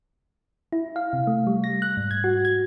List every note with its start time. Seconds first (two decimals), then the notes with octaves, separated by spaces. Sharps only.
0.72 E4
0.96 F5
1.13 C3
1.27 A3
1.47 G3
1.64 A#6
1.82 F#6
1.97 G#2
2.11 G#6
2.24 F#4
2.45 G#6